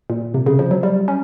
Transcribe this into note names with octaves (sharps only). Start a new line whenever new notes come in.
A#2
C3
C#3
F3
F#3
G3
C#4